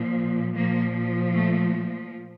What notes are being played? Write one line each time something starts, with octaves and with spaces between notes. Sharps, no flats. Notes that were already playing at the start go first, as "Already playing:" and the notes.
Already playing: A#2 F3
A#2 F3 A#3
A3